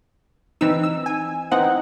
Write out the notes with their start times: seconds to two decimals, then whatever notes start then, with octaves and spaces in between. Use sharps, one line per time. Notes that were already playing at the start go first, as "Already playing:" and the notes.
0.61 E3 C4 D#4 E6
0.83 E6
1.06 G#5
1.51 E3 C4 D#4 F#5